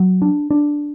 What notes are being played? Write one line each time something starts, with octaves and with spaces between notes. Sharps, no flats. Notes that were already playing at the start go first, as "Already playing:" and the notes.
Already playing: F#3
D4
D4